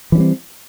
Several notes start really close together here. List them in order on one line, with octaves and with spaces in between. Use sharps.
E3 C#4 G3 C4